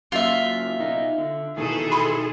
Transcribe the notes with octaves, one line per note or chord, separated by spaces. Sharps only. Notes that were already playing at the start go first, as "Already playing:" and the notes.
C#3 F#3 A#3 F4 E5
B2 D#4
D3
B2 D#3 E3 G#4 A4
B5 C6